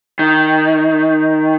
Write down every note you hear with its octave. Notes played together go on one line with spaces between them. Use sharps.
D#3